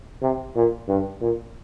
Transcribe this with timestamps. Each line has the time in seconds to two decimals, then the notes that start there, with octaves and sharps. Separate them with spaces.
0.22 C3
0.56 A#2
0.88 G2
1.21 A#2